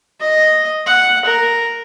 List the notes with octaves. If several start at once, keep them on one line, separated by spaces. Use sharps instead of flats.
D#5
F#5
A#4